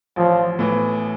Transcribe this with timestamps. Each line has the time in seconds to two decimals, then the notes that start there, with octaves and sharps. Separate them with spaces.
0.16 A1 F3
0.59 A2 E3